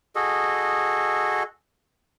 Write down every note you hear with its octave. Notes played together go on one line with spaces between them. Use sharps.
F#4 G#4 A4 D#5